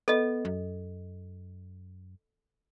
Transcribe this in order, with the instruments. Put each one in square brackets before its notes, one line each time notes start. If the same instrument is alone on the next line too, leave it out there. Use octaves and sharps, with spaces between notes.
[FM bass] B3 [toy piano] A4 D#5
[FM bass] F#2